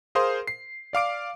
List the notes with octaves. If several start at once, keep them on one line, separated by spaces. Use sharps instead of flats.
G#4 A#4 C5 F5 C6 D#6
C7
D5 F5 D6 D7